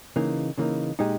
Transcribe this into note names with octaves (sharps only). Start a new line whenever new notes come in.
C#3 E3 A#3 D#4
C#3 E3 A#3 D#4
A#2 G#3 D#4 G4